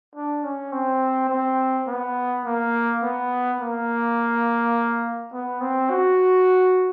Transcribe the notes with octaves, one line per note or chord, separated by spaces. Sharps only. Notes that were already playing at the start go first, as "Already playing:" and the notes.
D4
C#4
C4
C4
B3
A#3
B3
A#3
B3
C4
F#4